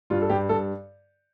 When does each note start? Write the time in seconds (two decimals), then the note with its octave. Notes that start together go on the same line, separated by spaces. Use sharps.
0.10 G2 F4
0.22 A4
0.30 G2 G4
0.49 G2 A4